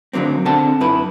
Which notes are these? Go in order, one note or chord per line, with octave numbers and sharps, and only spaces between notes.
D2 D3 F#3 A#3 C4
D3 C4 F#5 A5
F#2 E4 B4